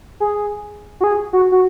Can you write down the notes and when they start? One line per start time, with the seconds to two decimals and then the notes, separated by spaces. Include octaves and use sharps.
0.20 G#4
1.00 F#4
1.04 G#4
1.33 F#4
1.52 F#4